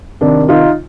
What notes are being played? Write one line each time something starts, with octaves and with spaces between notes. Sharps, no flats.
C3 D#3 D4
D#4 F4